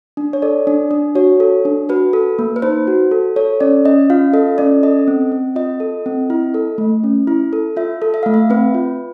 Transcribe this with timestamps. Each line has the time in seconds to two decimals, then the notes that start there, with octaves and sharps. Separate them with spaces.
0.17 D4
0.33 C#5
0.42 A4 D5
0.67 D4
0.91 D4
1.15 F#4 C#5
1.40 A4
1.65 D4
1.89 F#4 B4
2.13 A4
2.39 A#3
2.56 B4
2.62 D#4 C5
2.87 F#4
3.11 A4
3.36 A4 C#5
3.60 C#4 D5
3.85 C#4 D#5
4.10 F4 F5
4.34 A4 D#5
4.58 C#4 D5
4.83 A4 D#5
5.08 C4
5.32 C4
5.56 F4 D#5
5.80 A4
6.06 C4
6.30 E4
6.54 A4
6.78 A3
7.04 C#4
7.27 E4
7.53 A4
7.77 F4 E5
8.02 A4
8.14 E5
8.23 A3 F5
8.34 E5
8.50 C4 B4
8.74 F4